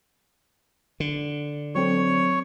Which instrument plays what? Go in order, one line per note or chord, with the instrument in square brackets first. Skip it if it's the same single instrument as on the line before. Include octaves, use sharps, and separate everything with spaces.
[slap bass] D3
[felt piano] F#3 C4 A4 [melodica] C#5 C#6